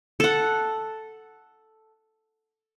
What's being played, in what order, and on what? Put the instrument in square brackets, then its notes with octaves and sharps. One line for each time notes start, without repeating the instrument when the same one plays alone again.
[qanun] A4 F#5